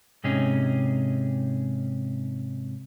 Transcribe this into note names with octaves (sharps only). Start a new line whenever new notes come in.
G#2 C3 C#4 D#4 G#4